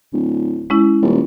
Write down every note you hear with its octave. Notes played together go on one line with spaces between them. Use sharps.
D1
G#3 C#4 E4
D#1